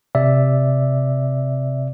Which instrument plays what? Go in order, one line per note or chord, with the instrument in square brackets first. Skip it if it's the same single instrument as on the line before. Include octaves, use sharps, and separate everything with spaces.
[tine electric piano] C3 D5 E5